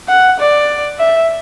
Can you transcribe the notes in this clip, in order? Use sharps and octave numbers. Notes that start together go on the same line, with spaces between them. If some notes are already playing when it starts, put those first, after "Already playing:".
F#5
D5
E5